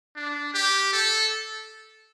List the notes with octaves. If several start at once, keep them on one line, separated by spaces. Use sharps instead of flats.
D4
G4
A4